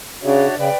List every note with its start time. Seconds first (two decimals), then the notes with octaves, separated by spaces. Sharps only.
0.23 C#3 D4 F#4 C#5 E5
0.57 C#3 B4 D5 G5